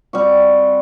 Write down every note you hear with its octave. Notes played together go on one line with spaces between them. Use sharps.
G3 C4 F#4